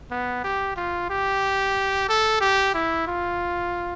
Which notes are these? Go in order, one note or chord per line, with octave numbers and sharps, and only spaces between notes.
B3
G4
F4
G4
A4
G4
E4
F4